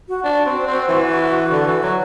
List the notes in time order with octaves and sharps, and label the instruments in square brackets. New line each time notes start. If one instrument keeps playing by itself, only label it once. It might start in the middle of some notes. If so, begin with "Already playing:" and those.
[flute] F#4
[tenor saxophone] D4 [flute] F#4
[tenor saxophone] C4
C4
E3
D3
E3
F#3